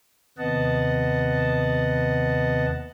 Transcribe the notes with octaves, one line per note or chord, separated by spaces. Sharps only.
D#2 C3 B3 D#5 F#5 A5